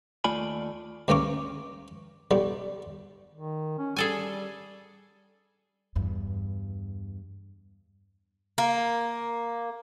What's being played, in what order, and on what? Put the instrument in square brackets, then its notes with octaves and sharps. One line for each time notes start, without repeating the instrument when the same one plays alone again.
[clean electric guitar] D#2 A3 F4 D5 G#5 B5
[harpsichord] D2 G2 A#3 C#4 D6
B1 G3
[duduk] D#3
C#4
[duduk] G3 [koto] G#4 A4 G#5
[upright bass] E2 G2
[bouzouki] A#3